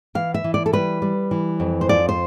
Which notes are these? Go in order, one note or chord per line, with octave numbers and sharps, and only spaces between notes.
E3 F5
E5
E3
D5
A4
G3 B4
G3
E3
F2
C5
F3 D5
C5